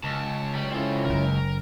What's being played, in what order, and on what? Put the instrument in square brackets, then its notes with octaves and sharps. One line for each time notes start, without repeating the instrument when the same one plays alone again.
[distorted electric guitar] C#2 [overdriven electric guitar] A5
[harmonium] F#3 [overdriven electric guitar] G3
[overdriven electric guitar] C4 A4 [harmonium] C#4 E4 F4
[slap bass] F#1 C#3 [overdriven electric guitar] A#4